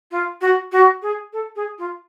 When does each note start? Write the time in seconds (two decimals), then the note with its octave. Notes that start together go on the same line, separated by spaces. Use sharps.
0.11 F4
0.41 F#4
0.72 F#4
1.02 G#4
1.33 A4
1.56 G#4
1.79 F4